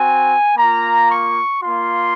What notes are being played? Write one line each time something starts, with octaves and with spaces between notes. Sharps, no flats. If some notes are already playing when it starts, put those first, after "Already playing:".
Already playing: C4 F#4 G#5
A#3 F4 A#5
C#6
A#3 F4 C6